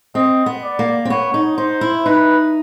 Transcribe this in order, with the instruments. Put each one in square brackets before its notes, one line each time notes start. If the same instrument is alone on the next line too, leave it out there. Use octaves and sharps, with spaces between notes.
[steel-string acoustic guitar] C4 [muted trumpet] D#5
[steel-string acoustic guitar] B3
[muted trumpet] D5
[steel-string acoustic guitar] A#3
C4
[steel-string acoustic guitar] B3 [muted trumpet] C#5
[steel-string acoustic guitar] D#4
[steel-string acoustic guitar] D#4 [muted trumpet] C5
[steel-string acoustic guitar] E4
[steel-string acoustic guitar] D#4 [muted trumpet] B4